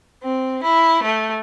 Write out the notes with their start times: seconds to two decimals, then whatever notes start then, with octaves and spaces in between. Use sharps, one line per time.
0.23 C4
0.62 E4
1.02 A3